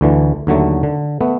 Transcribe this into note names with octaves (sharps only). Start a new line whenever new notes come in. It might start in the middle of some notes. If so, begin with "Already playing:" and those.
D2 D3 E3
D#2 D3 F#3 A3
D3
A3 B3